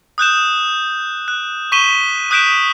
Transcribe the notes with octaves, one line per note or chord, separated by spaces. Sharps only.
D#6 F#6 G6 E7
F#6
C#6 B6 D#7 E7 G7
D#6 F#6 G6 B6 D7 E7